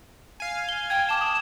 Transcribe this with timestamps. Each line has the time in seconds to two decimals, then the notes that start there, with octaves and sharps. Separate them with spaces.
0.40 F5 G#5
0.69 G7
0.90 G5 G#6
1.09 A5 D6 E7
1.21 D#6